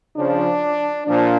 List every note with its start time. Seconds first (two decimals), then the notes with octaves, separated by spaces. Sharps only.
0.17 C#3 F3 D4
1.08 A#2 F3 D4